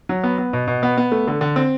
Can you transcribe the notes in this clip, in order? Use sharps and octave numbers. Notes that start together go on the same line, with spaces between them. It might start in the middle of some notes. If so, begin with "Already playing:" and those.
F#3
B3
B3
B2
B2
B3
B3
A3
D3
D3
C4